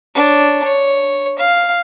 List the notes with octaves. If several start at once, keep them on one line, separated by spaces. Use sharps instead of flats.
D4 C#5
C#5
F5